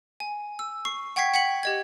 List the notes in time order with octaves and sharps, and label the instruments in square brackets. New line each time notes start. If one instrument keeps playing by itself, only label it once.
[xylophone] G#5
E6
C#6 C7
F#5 G5 C#6 G#6 B6 C7
F#5 G5 B6 C#7 F#7
G4 D#5 G#6